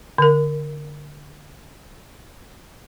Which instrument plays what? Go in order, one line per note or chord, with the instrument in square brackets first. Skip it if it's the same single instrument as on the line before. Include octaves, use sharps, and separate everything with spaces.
[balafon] D3 A#4